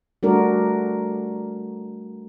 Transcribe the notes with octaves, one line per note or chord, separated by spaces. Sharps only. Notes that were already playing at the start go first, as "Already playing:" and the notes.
G3 A3 D4 F#4 A#4 D5